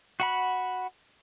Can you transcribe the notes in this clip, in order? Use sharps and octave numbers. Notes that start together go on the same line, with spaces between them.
F#4 F#5 B5